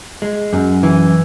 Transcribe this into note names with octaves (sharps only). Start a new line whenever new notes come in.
G#3
F#2
E3